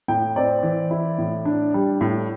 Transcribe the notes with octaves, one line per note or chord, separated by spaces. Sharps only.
A2 G5
C4 D5
E3
E4
A2
D4
G3
A2